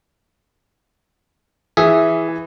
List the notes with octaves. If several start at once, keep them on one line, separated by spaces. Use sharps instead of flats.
E3 G#4 E5